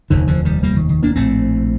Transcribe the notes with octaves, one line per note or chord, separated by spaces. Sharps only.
F1 D#2 D3 D#3
D3 F3
D#3 G3
G3 A#3
D#3
D#3
A#3 D4
A#1 A2 A3 C4